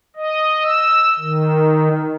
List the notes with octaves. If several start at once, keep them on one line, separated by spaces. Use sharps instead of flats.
D#5
E6
D#3